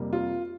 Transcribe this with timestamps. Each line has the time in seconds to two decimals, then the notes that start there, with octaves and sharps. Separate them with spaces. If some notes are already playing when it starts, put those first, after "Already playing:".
Already playing: F2 C3 G3 A#3
0.13 F4